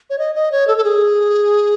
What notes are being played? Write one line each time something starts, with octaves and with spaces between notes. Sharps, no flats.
C#5
D#5
D#5
C#5
A4
A4
G#4